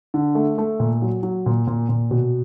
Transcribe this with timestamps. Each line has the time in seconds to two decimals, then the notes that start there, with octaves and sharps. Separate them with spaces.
0.14 D3
0.35 A3
0.58 A3
0.80 A#2
1.02 F#3
1.23 F#3
1.46 A#2
1.67 A#2
1.89 A#2
2.11 B2